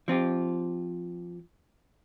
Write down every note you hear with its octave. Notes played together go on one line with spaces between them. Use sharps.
F3 C4 F4 G4